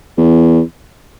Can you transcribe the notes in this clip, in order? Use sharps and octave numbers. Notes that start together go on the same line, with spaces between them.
E2